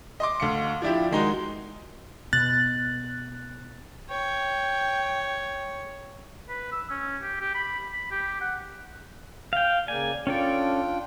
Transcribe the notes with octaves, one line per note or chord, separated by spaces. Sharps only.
D#5 C6 D6
D2 F5 C#7
F3 D4 E4 G4
D#3 G#3 D#4 F#4
B2 B3 F#6 A6
C#5 G5
B4
E6
C#4
G4
G4
B5
B5
G4
F#5
F5 G5
C#3 A#3 D5 G#5
C#4 D4 F4 A4 D5 G5